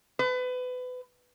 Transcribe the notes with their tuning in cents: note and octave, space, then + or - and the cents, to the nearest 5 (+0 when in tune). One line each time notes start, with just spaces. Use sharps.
B4 +30